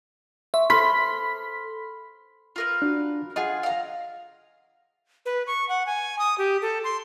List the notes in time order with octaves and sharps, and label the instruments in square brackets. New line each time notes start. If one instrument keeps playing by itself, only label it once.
[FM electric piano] E5 [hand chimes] C6 C#6
[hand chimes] A4 C5 F6 [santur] B5 C6 [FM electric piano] B6
[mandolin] F4 A#4 B4
[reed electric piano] D4 F#4
[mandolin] F4 G#4 [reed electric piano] D#5 F#5
[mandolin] F5 A#5
[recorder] B4
C#6
F#5
G#5
D#6
G4
A4
C6